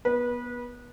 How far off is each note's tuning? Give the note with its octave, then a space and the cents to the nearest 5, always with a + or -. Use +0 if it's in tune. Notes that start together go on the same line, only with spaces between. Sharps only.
B3 -20 B4 -30